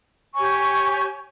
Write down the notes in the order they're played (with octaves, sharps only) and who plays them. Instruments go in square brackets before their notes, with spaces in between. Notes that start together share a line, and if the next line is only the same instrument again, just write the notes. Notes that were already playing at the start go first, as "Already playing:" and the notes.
[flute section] G4 C#5 G#5 C#6